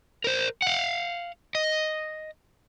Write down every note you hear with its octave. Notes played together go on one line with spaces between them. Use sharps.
A#4 C5
F5 F#5
D#5